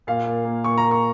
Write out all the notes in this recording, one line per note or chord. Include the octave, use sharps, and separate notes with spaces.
A#2 F5
A#2
A#3
A#2 C#6
A#5
A#2
C#6